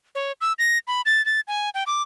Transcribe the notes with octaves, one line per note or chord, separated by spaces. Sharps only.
C#5
E6
A#6
B5
A6
A6
G#5
G5
D6